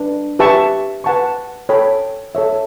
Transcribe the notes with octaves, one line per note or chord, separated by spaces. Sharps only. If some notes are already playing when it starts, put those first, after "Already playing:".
Already playing: D4 B4
G4 B4 E5 A5 C#6
B4 F#5 A5 C#6
A4 C#5 G5 B5
A4 C#5 E5